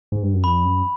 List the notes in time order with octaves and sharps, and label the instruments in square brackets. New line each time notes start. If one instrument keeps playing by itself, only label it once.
[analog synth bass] G#2
G2
F#2
[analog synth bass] F2 [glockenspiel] B5
[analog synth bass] F#2